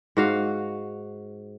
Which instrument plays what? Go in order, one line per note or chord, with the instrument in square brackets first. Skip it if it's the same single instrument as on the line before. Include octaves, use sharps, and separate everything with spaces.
[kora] G#2 F#4 F5